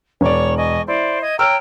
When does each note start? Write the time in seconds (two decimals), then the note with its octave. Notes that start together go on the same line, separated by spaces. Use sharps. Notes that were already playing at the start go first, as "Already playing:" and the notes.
0.21 E1 C#5 D5 C#6
0.58 D#5 G#5 C#6
0.88 E4 C5 D5
1.22 D#5 G#6
1.39 C#5 G5 A#5 E6 F6